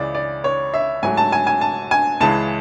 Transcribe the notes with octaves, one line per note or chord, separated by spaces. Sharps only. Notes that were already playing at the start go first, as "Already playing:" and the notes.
Already playing: C#2 C#3 E3 D5
D5
C#5
E5
G#2 F#3 A3 G#5
A5
G#5
G#5
A5
G#5
C#2 C#3 E3 G#3 A5